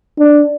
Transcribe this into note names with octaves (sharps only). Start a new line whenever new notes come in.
D4